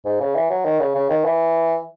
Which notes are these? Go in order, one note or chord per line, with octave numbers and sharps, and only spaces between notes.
G#2
C#3
E3
F#3
D#3
C#3
C#3
D#3
E3